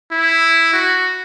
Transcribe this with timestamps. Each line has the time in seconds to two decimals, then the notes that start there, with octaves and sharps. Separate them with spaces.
0.12 E4
0.73 F#4